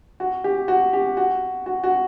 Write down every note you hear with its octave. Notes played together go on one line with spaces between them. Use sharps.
F#4
G4
F#4
G4
F#4
F#4
F#4